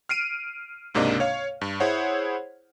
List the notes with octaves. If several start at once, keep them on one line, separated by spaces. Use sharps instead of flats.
F6 C7 D7 D#7
C#2 G#2 C3 A#3 D4 D#5
C#5 F5
G2
E4 G#4 C5 C#5 F#5